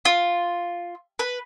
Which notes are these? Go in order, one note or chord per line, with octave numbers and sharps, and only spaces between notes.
F4
B4